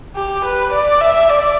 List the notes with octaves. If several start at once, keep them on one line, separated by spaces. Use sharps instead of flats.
G4
B4
D5
E5
D5